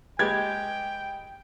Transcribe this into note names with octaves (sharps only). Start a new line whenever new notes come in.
G#3 G4 B4 G5 G#6